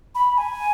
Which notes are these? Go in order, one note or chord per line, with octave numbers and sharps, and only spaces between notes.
B5
G#5